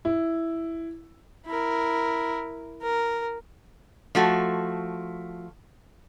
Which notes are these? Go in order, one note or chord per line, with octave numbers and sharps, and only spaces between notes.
E4
E4 A#4
A#4
F3 A3 F#4